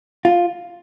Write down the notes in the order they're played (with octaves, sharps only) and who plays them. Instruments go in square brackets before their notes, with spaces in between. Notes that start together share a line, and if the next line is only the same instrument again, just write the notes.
[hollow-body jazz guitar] F4